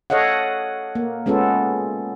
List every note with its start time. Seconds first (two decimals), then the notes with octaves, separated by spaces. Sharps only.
0.10 A4 C#5 D#5 F5 F#5
0.95 A#3
1.26 G#3 B3 C#4 F4 A4